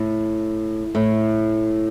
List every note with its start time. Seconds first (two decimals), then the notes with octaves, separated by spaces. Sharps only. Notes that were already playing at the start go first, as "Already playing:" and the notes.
Already playing: A2
0.95 A2